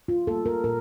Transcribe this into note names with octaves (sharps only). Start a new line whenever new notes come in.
F4
G3 A#3 A4
A#4
A#2 A#4